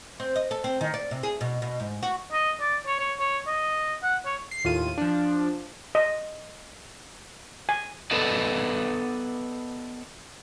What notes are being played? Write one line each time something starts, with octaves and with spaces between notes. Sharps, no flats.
C4
D#5
A4
C4
D#3
D5
C3
G#4
B2
B2
G#2
F#4
D#5
D5
C#5
C#5
C#5
D#5
F#5
C#5
C7
D#2 A2 F4 D#7
F3 D4
D#5
G#5
B3 A4 B4 D5 D#5